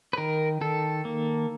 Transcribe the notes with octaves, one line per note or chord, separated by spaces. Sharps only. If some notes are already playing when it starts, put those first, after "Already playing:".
B4
D#3 A#4
D#3 A4
A#3